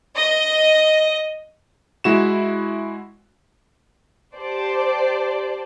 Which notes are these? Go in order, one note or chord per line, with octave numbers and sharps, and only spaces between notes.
D#5
G#3 E4 F#4 E7
G4 C5 D5 A5